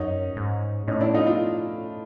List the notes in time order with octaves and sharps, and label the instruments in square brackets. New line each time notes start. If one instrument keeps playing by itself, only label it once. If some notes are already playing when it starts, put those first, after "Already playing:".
Already playing: [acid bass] F#2 [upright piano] C#4 D#4
[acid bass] G#2
[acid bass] A2 [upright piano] C#4 D#4
[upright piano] D4 E4
D#4 F4
D#4 F4